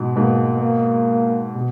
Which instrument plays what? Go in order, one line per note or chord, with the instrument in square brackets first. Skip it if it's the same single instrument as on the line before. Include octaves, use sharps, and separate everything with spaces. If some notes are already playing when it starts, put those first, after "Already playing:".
Already playing: [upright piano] G#2 B2
[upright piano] G#2 B2 [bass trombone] A#3
[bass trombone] A#3
[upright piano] B2